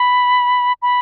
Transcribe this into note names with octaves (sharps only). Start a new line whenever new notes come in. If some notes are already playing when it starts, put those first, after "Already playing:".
Already playing: B5
B5